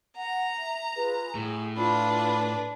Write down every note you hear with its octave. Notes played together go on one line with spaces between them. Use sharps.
F#5 A#5
E5
F4 G#4 B4
A2 G#4
D4 F4 B4 B5